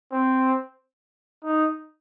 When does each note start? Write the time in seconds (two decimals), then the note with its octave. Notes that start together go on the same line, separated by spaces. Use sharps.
0.12 C4
1.44 D#4